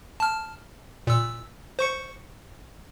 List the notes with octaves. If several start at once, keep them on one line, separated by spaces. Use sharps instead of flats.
A5 F6
A#2 E6
C5 C#6 C#7